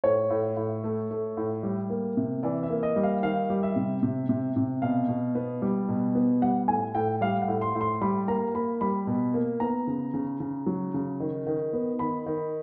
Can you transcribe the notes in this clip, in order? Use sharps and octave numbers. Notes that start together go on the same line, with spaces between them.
A2 C#5
A2
A2
A3
A3
A2
G3
A#3
C3
E3 D5
E5
A#3
D#5
G3
F5
D#3 F5
G3
E5
C3
C3
C3
C3
B2 F5
B2
B3
G3
B2
B3
G3 F#5
A2 G#5
A2 G5
G3 F5
F#5
A2
C6
A2
C6
G3 B5
A#3 A#5
A#3 B5
G3 B5
B2
A#3
B3 A#5
C#3
C#3
C#3
F#3
C#3
D#3
D#3
B3
D#3 B5
D#3